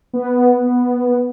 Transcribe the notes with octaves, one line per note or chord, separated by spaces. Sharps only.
B3